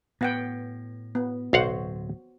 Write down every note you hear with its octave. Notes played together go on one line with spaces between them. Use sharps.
A2 B3 F#5 G5
B3
D1 B1 F#3 F#4 C5 F5 F#5